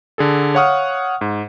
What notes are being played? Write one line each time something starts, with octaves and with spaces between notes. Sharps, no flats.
D3 G#4 A4
C#5 F5 F#5 C#6 D#6 F6
G#2